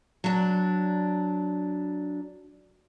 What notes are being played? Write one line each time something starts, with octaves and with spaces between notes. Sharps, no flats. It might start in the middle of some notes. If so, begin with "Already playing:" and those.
F#3 D4